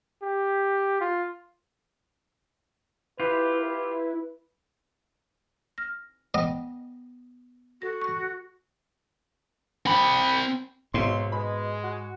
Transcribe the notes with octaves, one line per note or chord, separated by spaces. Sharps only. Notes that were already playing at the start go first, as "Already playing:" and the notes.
G4
F4
E4 F4 G4 B4
B4
F6 A#6
B3 D#5 F#5 G5
F#4 A4 A#6
C#6
C4 B5
B1 G#2 B2 F#3 C6
B2 G#3 B5
F#4